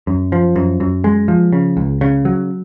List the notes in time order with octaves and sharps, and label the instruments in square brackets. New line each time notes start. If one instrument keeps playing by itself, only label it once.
[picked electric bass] F#2
F3
F#2
F#2
G#3
F3
C#3
C#2
C#3
F#3